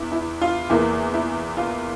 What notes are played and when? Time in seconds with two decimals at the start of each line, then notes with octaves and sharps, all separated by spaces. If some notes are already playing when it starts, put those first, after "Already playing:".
Already playing: E2 E4
0.12 E4
0.41 F4
0.70 E2 E3 A#3 E4
1.14 E4
1.57 F4